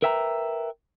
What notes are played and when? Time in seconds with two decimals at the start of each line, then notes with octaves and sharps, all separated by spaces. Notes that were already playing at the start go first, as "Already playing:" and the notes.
0.02 A#4 B4 E5 G5 G#5 A#5